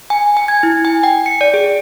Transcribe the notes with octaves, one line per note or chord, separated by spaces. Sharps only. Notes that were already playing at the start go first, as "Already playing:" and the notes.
G#5
G#5
G#6
E4
G#5
G5
C#7
D5
G#4